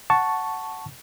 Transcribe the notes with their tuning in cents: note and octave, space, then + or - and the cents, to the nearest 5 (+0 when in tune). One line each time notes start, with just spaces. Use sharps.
F#5 +0 A5 +0 C#6 +0